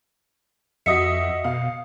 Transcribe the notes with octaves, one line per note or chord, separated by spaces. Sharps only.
F2 F#4 D#5 E5 D#6 C#7
B2 F5